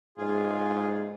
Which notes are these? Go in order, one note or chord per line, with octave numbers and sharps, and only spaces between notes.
G#2 F4 G#4